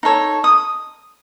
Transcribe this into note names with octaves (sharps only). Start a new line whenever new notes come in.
D#4 A4 C#5
D#6